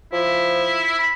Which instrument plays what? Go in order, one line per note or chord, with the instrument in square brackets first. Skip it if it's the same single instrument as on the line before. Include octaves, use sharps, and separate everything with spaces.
[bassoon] F3 [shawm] E4
[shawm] B5